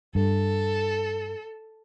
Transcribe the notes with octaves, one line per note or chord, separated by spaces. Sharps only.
G2 A4